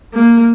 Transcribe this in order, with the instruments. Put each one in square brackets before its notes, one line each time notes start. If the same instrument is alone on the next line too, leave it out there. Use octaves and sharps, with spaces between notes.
[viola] A#3